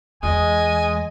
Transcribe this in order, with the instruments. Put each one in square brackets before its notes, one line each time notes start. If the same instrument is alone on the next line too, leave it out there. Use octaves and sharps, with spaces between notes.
[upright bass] E2 [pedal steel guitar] G#3 [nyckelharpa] D#5 [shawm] G#5